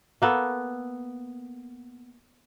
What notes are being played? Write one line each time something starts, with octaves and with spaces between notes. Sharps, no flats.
A#3 B3 A4